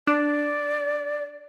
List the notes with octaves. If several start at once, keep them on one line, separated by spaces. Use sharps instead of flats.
D4 D5